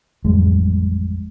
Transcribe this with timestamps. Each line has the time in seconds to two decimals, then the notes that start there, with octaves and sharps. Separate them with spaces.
0.25 A1 F2 G3 G#3